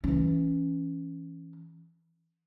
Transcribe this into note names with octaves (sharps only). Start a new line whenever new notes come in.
E3 C#4